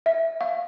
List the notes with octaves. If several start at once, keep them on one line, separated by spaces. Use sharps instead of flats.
E5
F5